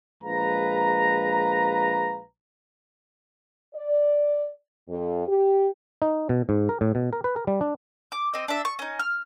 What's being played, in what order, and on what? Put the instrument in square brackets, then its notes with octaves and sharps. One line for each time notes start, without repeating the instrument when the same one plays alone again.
[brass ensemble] A#1 G#3 B4 F5 A#5
[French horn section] D5
F2
G4
[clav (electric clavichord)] D#4
B2
G#2
A#4
A2
B2
A#4
B4
A#4
G3
D4
[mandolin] D6
C4 D#5
D4 E5
C#6
C#4 D#4
F6